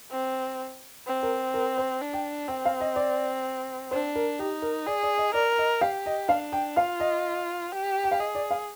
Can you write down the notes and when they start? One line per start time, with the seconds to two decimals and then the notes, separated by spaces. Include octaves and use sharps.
0.11 C4
1.06 C4
1.23 A#4
1.54 A#4
1.78 C5
2.02 D4
2.13 G5
2.48 C4 G5
2.65 F5
2.81 D#5
2.96 D5
3.91 D4 C5
4.16 A#4
4.39 D#4 G4
4.62 A#4
4.87 G#4 D5
5.03 D5
5.18 D#5
5.34 A#4 D5
5.58 D#5
5.81 G4 F5
6.06 D#5
6.29 D4 F5
6.52 G5
6.77 F4 F5
7.00 D#5
7.72 G4
8.04 G5
8.11 F5
8.19 G#4 D#5
8.35 D5
8.51 F5